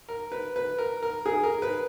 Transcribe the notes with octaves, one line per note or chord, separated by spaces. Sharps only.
A#4
B4
B4
A#4
A#4
G#4
A#4
B4